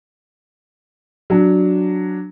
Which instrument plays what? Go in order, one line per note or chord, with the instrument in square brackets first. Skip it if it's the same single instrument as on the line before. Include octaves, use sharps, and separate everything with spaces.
[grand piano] F#3 D4